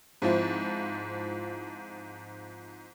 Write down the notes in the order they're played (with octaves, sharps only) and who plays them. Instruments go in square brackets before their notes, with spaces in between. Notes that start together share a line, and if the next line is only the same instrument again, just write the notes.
[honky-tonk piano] G#2 F3 C4 E4